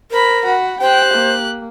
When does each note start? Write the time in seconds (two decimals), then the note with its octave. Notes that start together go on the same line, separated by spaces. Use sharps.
0.11 A#4 C5 B5
0.45 F#4 F#5 B5
0.81 G4 C5 G5 F#6
1.14 A#3